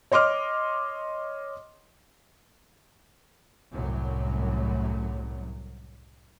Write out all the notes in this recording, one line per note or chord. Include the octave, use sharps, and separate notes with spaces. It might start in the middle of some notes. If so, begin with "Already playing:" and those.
C#5 D#5 C6 D6 F6
C2 F#2 A2 F#3